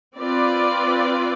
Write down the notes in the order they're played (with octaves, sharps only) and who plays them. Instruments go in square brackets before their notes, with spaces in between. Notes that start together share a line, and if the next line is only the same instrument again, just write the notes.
[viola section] C4 F4 B4 D5